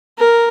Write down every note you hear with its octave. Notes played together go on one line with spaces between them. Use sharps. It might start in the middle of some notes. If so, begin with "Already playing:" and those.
A#4